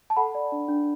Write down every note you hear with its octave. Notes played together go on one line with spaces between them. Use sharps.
A5
A4 F#5 B5
D5
D4
D4